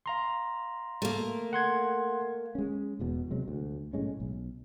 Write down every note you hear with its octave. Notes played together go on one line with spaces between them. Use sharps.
F5 A#5 C6
A3 A#3
F#5 C6 G#6
G#3 C#4
E1 E2 B2
C3 F#3 G#3
D2
B1 A2 G#3 C#4
B1